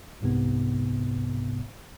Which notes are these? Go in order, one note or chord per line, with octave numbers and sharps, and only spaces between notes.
G1 C2 G#2 C3 B3